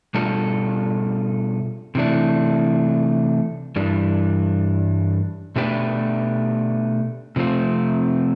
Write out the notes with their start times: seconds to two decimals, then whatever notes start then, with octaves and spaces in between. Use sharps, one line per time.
0.14 B2 G3 D4 F4 A4
1.95 C3 E3 A3 D4
3.76 G2 E3 G3 D4
5.56 B2 A3 D4 G4 B4
7.36 C3 F3 A3 C4 F4